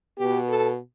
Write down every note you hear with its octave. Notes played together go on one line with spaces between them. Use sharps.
B2 B3 G4
A4